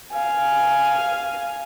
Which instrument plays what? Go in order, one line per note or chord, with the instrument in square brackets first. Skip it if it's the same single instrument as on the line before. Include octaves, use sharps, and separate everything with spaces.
[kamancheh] F5 G#5